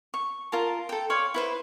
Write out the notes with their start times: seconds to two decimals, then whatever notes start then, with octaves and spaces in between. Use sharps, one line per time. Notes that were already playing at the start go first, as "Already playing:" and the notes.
0.14 C#6
0.52 F4 A#4 A5
0.89 A4 G5
1.10 C#5 D5 F5 C6
1.34 E4 B4 C5